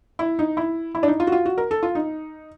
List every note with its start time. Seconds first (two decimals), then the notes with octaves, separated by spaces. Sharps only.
0.19 E4
0.39 D#4
0.57 E4
0.95 E4
1.03 D4
1.08 D#4
1.20 F4
1.27 F#4
1.32 F4
1.45 F#4
1.58 A#4
1.71 A4
1.83 F4
1.95 D#4